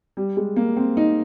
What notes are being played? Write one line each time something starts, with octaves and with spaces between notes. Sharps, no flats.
G3
G#3
A#3
C4
D#4